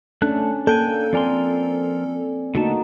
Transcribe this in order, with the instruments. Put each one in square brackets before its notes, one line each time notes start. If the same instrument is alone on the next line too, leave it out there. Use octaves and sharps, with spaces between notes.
[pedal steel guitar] A3 A5 F#6 [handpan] C#4 D4 A4
[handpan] A#3 [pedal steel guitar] D4 G5 G#5 [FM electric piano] A4 [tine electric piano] F#6 G6
[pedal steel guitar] F3 A#4 C6 [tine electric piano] C4 D5 G#5
[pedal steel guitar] D3 A3 A5 [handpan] A#3 D#4 F#4